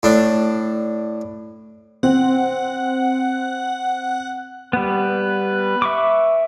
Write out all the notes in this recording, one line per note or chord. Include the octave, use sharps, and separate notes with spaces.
A2 D4
C4 F#5
G3 B3 B4
E5 C#6 D6